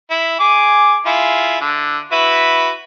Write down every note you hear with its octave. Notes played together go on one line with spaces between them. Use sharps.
E4
G#4 G#5 D6
E4 F4 G#4
D3
E4 F#4 B4